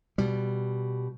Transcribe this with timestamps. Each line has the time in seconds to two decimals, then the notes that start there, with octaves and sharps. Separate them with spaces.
0.18 B2 G3